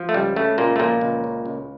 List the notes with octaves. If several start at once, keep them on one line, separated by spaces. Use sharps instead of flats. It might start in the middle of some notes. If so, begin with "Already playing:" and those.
Already playing: F3
A3
C#2 G3
C#3 A3
C#2 A#2 A#3
A3
A#2 F3 A#3
C#2
C#3
C#2